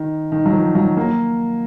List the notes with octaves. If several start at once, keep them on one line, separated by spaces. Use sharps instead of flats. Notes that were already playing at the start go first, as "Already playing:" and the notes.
Already playing: D#3
D#3
F#3
F3
F#3
A#3